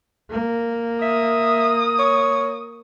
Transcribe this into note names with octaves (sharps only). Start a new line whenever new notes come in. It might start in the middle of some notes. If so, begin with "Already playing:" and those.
A#3
E5 D#6
C#5